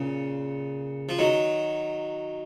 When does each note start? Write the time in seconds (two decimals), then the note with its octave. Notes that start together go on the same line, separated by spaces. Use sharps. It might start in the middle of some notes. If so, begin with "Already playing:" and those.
Already playing: A#2 C#3
1.09 F3
1.19 D#3 F#3